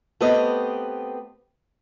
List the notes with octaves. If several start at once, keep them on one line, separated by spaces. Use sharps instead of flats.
A3 B3 C4 G4 B4 D#5